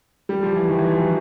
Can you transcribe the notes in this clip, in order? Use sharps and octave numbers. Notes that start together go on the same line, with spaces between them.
G3
F3
E3
D#3
E3
F3
F#3